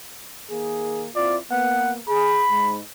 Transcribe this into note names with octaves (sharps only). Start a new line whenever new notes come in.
D#3 A#3 G#4
C4 E4 F4 D5
A#3 B3 F#5
G#4 B5
G#2